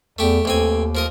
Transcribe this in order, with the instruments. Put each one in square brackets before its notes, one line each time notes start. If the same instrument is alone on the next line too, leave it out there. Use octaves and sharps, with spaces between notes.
[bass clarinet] E2 [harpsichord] A3 G4
[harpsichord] A1 C4 G#5 [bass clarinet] D#2
[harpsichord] F3 A#4 D#5